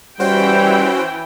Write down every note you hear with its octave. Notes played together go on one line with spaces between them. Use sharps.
E3 G3 C#4 E4 F#4 C5 G5